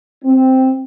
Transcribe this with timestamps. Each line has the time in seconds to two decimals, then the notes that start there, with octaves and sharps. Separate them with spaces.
0.24 C4